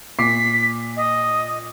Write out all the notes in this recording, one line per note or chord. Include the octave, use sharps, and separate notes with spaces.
A#2 D6 B6 C7
D#5